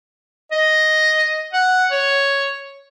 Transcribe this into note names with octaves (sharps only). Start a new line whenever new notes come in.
D#5
F#5
C#5